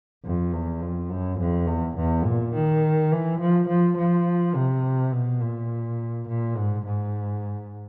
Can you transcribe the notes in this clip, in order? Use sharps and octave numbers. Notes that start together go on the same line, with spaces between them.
F2
E2
F2
F#2
F2
E2
E2
A#2
D#3
E3
F3
F3
F3
C3
B2
A#2
A#2
G#2
G#2